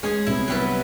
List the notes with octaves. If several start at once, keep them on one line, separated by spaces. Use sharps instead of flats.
G#3 C#4 G#4
C2 C3 B3 E4
F#3 G3 B4